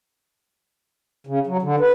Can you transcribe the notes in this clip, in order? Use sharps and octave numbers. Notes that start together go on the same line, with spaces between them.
C#3
F#3
D3
B4